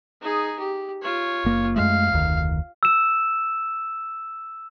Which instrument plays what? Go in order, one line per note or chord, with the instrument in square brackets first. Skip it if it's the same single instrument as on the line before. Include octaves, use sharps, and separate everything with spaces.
[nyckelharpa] D#4 G#4
G4
F4 C#5
[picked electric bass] F#1 A#3
[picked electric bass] F#2 G#3 A3 [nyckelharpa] F5
[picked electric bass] F1 D2 D#3
[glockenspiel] E6 E7